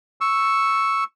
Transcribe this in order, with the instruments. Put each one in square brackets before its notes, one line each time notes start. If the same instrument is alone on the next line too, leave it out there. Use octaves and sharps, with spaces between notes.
[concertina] C#6 E6